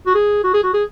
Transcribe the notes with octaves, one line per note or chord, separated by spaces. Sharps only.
F#4
G#4
F#4
G#4
F#4
G#4